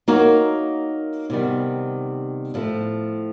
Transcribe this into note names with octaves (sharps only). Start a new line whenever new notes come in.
A#3 D#4 F#4 A#4 C#5
C3 D#3 G3 B3
A2 F3 A3